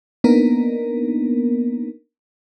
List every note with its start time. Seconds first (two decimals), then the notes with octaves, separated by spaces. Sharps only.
0.24 A#3 B3 D4 D#4 A#4